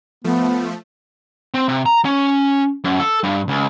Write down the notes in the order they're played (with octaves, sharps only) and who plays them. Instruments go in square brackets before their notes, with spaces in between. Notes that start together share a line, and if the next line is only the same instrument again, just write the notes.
[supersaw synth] F3 A3 [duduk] B3
[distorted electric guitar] C4
C3
A#5
C#4
F#2
A4
G2
C#2